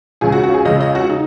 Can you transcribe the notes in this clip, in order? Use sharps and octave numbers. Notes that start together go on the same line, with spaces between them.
C#2 C#3 G#4
F#4
F#4
G#4
C#2 C#3 D#5
D#5
F#4
D#4